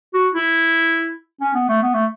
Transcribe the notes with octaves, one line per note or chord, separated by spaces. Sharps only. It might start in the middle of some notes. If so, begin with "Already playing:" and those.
F#4
E4
C#4
B3
A3
B3
A3